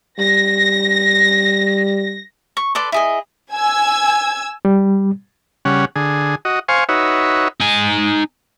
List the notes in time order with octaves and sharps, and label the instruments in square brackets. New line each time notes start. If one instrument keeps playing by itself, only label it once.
[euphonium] G3 [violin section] A#6
[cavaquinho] C#6
A4 B4 D5 C6
E4 G#4 D#5
[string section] G#5 E6 G#6
[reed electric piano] G3
[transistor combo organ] C#3 G3 C#4 F#5
D3 G#4
F#4 D#5
C5 F5 G#5 C#6
D#4 F#4 B4 C#5 E5
[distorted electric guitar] D#4 G#5